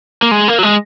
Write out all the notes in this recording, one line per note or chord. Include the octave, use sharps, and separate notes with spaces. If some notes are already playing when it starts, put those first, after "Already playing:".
A#3
G#3
A#3
F#3
G#3